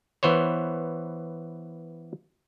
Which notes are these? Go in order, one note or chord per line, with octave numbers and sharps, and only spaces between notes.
E3 B3 C5 C#5